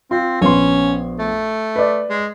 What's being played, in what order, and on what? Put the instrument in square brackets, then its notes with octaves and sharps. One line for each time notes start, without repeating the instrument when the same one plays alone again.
[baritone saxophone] C4 [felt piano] F4
[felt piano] A#1 B3 C6 [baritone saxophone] C#4
[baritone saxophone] A3
[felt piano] B4 D5
[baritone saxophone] G#3